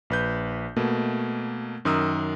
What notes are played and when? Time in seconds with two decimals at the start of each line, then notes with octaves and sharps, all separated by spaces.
0.10 A#1 B4 G6
0.76 B2 A3 A#3
1.85 F#2 D#3 A#4 D#6 E6